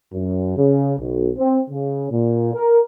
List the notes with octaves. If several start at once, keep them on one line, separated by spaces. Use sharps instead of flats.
F#2
C#3
B1
C4
C#3
A#2
A#4